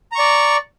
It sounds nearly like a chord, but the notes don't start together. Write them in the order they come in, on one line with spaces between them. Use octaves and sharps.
A#5 C#6 D5